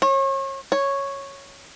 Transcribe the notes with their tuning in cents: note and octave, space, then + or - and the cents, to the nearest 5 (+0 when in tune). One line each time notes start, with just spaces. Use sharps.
C#5 -35
C#5 -5